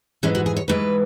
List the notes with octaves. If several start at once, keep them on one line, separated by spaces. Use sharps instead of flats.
G#2 E3 G#3 C#4
F#4
G#4
C#5
G#2 E3 G#3 B4